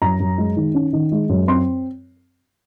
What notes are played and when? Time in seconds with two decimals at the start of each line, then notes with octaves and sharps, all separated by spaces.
0.02 F#2 A#5
0.20 F#2
0.38 G#3
0.57 D#3
0.74 C#4
0.93 D#3
1.12 G#3
1.29 F#2
1.47 C4 C6